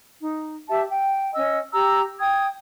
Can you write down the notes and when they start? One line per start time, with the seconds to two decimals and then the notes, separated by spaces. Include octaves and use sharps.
0.19 D#4
0.69 G4 E5 A5
0.90 G5
1.34 C#4 D#5 E6
1.73 G4 A#5 E6
2.19 G5 D#6 G#6